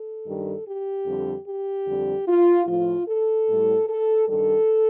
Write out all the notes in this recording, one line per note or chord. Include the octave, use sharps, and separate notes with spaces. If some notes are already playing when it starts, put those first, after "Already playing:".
Already playing: A4
G2 D#3 G3
G4
F2 D3 G3
G4
F2 D3 G3
F4
A2 F3 F4
A4
A2 G3
A4
G2 D#3 G3 A4